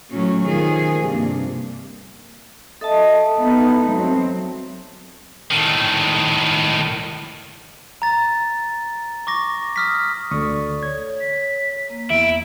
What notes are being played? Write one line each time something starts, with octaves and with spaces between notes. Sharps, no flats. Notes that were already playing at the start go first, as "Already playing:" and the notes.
A2 F#3 C#4
D#3 F3 G#4
G2 C3 A#3
A4 D#5 E5 A5
B3 D#4
F#3 C4
A2 D#3
A#5 A6
C#6 D6 A#6
D#6 F6 B6
D2 A4 D5 C#6 D#6
C#5 G#6
B6
A#3
E2 E4 D7